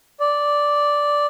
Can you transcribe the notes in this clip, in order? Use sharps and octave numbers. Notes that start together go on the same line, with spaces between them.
D5